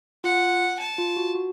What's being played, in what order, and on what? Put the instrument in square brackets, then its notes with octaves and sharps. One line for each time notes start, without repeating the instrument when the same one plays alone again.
[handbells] F4 [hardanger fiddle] F#5
[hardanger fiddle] A5
[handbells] F4
F#4
F#4